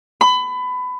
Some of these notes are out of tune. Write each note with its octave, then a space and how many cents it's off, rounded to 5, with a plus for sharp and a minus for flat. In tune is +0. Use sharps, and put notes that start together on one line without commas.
B5 +25